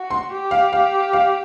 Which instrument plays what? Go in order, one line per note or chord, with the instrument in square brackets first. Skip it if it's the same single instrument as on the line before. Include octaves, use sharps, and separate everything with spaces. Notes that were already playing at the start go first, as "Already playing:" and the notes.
Already playing: [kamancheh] F#4
[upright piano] C6
[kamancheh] G4
[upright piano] F5
F5
F5